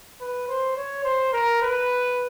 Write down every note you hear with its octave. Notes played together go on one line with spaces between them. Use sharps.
B4
C5
C#5
C5
A#4
B4